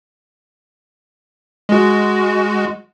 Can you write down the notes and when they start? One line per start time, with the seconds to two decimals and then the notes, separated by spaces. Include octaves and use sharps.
1.69 G#3 F#4